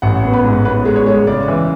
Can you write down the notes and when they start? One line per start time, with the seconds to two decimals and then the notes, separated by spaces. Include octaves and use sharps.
0.02 A1 F#5
0.23 B3
0.33 B4
0.44 G#2
0.65 B3 B4
0.85 G#3
0.96 C#5
1.06 G#3
1.27 C#3 D5
1.48 E3